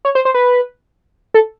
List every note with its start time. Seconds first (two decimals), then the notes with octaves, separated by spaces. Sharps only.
0.05 C#5
0.15 C5
0.25 C5
0.34 B4
1.34 A4